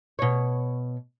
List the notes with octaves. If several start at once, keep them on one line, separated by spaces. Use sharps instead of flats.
B2 C#5